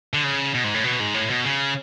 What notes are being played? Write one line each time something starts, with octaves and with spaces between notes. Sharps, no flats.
D3
C#3
B2
G#2
A2
B2
G#2
A2
B2
C#3